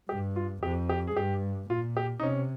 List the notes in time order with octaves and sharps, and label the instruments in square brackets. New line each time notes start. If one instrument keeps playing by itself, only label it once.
[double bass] G2 [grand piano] G4
[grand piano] F4
[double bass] F2 [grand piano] G4
[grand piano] G4
G#4
[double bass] G2 [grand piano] G4
[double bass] A#2 [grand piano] F4
[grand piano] G4
D#4
[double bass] C3 [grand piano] C#4